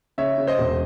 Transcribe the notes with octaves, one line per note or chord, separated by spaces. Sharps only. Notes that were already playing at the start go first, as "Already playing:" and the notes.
C#3 C#5 E5
C#3
C5 D#5
E1